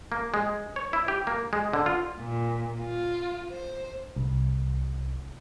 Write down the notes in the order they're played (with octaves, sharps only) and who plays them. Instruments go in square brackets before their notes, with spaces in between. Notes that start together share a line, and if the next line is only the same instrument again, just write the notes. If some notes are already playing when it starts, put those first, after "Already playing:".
[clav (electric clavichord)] A#3
G#3
C#5
E4
G4
A#3
G#3
D3
F4
[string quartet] A#2
F4
C5
[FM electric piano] C2